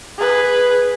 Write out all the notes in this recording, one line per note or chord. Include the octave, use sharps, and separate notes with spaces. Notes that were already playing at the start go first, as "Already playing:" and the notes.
G#4 B4